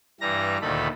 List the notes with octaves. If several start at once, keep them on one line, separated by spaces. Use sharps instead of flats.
G2 E3 G3 A#5 A#6
D2 A#2 D#3 A4 B5